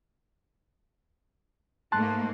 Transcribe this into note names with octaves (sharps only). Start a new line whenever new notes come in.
G#2 A3 A#3 A5 C6 F#6